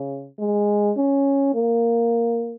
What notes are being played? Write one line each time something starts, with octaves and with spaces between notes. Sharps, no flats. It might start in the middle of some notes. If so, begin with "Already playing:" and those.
Already playing: C#3
G#3
C#4
A#3